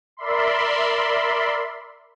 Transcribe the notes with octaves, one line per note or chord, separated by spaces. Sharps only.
A#4 D5 E5 B5 C6